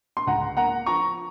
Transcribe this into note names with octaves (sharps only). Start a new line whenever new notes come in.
C6
C#2 F#5 A#5
A#3 F#5 A#5
F3 A#5 C#6